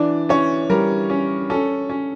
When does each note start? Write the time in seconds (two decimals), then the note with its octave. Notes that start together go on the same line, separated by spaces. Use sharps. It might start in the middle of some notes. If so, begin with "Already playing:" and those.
Already playing: E3 D4 D5
0.29 E3 C#4 C#5
0.70 G3 A#4
1.10 C#4
1.50 C#4 A4
1.90 C#4